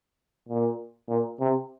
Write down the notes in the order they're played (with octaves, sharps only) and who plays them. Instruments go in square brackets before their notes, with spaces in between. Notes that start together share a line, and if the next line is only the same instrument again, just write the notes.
[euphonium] A#2
A#2
C3